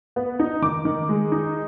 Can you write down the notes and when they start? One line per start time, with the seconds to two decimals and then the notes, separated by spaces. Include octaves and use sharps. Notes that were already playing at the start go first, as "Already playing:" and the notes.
0.16 B3
0.39 D#4
0.62 D#3 D6
0.85 D#3
1.09 G#3
1.32 D#4